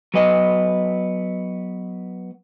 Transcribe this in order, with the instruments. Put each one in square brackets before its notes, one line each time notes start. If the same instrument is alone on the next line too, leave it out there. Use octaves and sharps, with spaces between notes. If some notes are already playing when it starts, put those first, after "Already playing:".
[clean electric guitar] F#3 B3 D#5